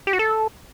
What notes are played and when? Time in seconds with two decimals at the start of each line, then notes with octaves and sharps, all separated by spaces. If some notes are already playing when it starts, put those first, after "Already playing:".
0.07 G4
0.13 F#4
0.19 A4